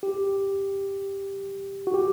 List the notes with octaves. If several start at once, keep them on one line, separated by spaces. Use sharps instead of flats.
G4
F#4
G4